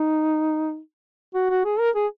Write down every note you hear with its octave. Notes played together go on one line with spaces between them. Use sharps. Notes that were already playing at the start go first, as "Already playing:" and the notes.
Already playing: D#4
F#4
F#4
G#4
A#4
G#4